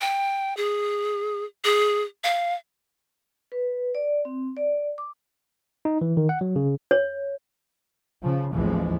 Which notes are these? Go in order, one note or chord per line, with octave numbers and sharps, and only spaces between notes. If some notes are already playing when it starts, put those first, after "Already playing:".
G5
G#4
G#4
F5
B4
D5
C4
D5
D6
D#4
E3
D#3
F#5
F#3
C#3
C#5
C#3 F3
A1 D#2 E3 F3 G#3